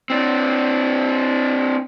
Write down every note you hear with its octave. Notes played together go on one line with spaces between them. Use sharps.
C4 D4